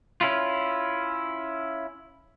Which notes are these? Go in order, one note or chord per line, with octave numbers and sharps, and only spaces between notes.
C#4 E4 F4